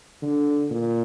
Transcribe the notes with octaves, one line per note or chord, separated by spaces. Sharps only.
D3
A#2